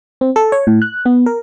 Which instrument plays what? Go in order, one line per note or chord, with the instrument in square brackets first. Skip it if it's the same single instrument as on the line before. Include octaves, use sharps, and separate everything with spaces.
[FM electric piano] C4
A4
C#5
A2
F#6
B3
A#4